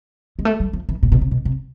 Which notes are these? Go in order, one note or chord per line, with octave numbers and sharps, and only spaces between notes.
G#3
A3
G3
F3
E3
A#2
B2
C3
B2
C3